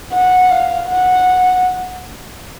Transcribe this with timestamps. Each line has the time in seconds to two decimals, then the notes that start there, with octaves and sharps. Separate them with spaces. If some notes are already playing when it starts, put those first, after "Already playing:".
0.13 F#5
0.50 F5
0.88 F#5